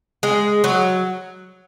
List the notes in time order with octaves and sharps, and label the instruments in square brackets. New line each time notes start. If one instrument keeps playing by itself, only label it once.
[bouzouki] G#3
F#3